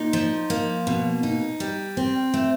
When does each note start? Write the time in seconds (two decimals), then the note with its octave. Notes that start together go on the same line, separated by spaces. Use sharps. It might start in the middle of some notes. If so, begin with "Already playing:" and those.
Already playing: A#2 D#4
0.13 F3
0.50 A#3
0.87 B2
1.23 D#4
1.60 G3
1.97 C4
2.34 A3